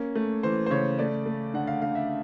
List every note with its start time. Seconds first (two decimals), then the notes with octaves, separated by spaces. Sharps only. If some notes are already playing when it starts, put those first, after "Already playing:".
Already playing: A#3 C#4
0.15 A3
0.43 E3 C5
0.66 C5
0.70 C#3 C#5
0.99 A3 D5
1.26 A3
1.54 D3 F#5
1.67 F5
1.82 D3 F5
1.95 E5